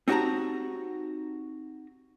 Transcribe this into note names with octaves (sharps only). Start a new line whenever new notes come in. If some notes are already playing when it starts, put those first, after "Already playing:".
C4 D#4 F#4 G4 A5 A#5